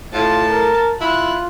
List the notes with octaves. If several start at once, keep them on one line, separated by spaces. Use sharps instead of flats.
A2 F4 A5
A#4
E4 F4 F#6